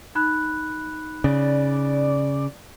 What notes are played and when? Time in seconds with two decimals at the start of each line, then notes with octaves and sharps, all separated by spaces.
0.15 D#4 B5 F#6
1.24 C#3 D5